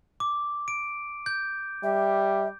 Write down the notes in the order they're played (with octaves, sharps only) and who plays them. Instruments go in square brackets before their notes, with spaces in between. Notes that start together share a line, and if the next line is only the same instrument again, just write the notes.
[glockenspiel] D6
D7
G6
[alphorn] G3 [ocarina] E5